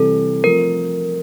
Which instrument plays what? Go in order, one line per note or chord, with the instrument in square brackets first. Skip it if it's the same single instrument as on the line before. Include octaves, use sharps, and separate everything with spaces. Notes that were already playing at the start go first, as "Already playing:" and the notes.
Already playing: [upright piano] C3 E3 G3 C4 [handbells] A4
[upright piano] F3 A3 C4 [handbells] A#4